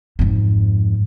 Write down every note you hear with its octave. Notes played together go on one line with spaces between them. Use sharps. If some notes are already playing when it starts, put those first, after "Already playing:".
F2 G#2